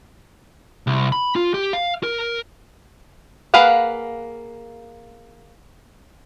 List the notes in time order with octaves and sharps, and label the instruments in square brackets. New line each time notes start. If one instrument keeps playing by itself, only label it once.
[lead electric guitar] C2
B5
F4
G4
F5
A#4
[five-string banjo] A#3 G#4 B4 F5 F#5